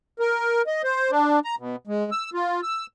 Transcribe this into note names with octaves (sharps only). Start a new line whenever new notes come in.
A#4
D#5
C5
D4
A#5
B2
G#3
E6
F4
E6